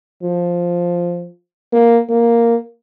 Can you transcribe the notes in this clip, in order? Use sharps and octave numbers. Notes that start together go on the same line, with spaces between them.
F3
A#3
A#3